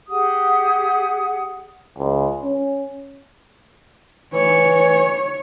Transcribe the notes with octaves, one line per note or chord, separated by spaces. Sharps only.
G4 G#4 F#5 D#6
C#2
C#4
E3 C#5